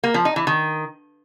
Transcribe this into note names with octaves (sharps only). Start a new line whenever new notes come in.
A#3
F3
D#4
E3
D#3